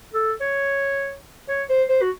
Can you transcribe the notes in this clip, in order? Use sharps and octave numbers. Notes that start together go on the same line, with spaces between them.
A4
C#5
C#5
C5
C5
F#4